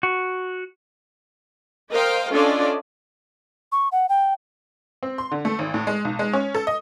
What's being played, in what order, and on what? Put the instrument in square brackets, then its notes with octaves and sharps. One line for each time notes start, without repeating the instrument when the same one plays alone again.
[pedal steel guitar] F#4
[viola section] A#4 C5 D#5 F5 G5
C#4 D4 F4 A4 D5 D#5
[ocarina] C#6
F#5
G5
[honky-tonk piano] C4
C6
D3
A3
G#1
A2
G#3
B1
G#3
C#4
A4
D#5